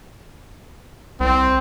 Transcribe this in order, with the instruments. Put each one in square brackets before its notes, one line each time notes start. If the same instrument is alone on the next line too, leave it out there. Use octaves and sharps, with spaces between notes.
[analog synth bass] C2 [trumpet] C4